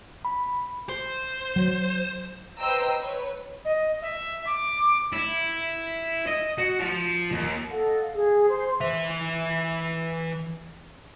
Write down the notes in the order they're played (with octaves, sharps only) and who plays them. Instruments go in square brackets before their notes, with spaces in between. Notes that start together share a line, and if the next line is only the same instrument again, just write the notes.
[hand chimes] B5
[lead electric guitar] C5
[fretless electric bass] F#3
[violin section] B4 C5 D#5 G5 A#5 E6
B4 C#5
[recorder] D#5
E5
D6
[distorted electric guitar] E4
D#5
F#4
F3
D#2
[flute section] A4 D#5 F5 F#5
F5
G#4
C5 C6
[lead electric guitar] E3 E5